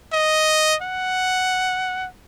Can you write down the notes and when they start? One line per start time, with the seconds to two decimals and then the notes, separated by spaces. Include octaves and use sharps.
0.13 D#5
0.82 F#5